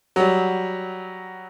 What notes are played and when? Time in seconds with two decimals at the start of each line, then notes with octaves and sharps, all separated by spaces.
0.16 F#3 G3